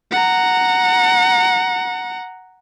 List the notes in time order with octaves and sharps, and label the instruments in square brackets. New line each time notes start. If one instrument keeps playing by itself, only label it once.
[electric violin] F#5 A#5